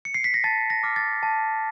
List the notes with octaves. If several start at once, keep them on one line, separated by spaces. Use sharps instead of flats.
C#7
C7
B6
A#6
A5 A6
A#6
D6 F6
A6
A5